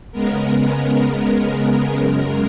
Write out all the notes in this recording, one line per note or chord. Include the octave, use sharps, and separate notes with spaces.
C#3 G#3 B3 A#4
F#2 C#3 G#3